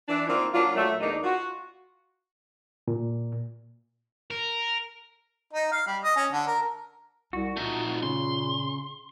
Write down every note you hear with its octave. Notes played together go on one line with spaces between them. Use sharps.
E3 D4
D#3 A#3 C4 E4 F4
F#3 A#3 D4 F4
A#2 F#3 A3
E2 A#3 D4 D#4
F4 F#4
A#2
A#4
D#4
F5
G3
D#5
C#4
D3
A#4
C2 F#4
A#2 A3 D#4
C#3 C6